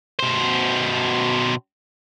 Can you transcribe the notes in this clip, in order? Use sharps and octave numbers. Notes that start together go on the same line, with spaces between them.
B2 C5